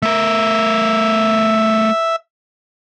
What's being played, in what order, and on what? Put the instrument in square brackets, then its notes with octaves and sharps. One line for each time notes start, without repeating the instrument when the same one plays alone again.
[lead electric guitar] A3 A#4 [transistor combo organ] E5